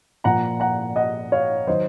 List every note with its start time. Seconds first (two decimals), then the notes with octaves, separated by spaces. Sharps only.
0.24 A#2 F3 F#5 A#5
0.60 F#5 A#5
0.96 D#5 F#5
1.32 C#5 F5
1.67 D#3 F#3 C5 D#5